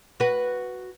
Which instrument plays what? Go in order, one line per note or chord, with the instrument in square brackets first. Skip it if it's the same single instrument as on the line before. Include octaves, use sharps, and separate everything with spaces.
[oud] F#4 B4